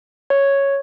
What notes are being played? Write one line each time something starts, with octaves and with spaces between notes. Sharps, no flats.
C#5